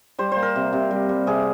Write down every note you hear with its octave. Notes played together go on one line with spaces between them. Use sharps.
G3 C5
A#3 C5
A#4
C3
C3
G3
G3
C3 G#4